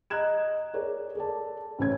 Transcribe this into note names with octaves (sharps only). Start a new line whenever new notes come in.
D#5 A#5 F#6 G#6 E7
G#4 A#4 C#5 D5
G#4 A4 D5 A5
A1 C#4 G#6